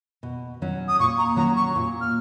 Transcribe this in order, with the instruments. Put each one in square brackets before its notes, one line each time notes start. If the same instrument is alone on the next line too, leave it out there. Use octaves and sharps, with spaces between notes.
[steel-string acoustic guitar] B2
F#3 C#4
[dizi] D#6
[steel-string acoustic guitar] A#2 [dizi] C#6
[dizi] A#5
[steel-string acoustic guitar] F#3 C#4 [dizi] A#5
[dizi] C#6
[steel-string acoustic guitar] A#2
[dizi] F6